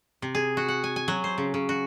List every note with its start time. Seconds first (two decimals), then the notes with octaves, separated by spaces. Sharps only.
0.22 C3
0.35 G#4
0.57 F#4
0.68 F#5
0.84 G#5
0.96 G#5
1.08 F#3
1.24 C5
1.38 C#3
1.54 C#3
1.69 F#4